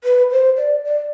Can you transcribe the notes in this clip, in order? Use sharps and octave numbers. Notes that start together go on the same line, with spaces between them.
B4
C5
D5
D5